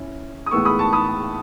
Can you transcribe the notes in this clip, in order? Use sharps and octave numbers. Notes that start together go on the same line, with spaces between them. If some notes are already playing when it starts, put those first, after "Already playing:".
Already playing: C#4 E4
D#6
A2 E3 G#3 B3 C#6 E6
B5 D#6
A5 C#6
B5 D#6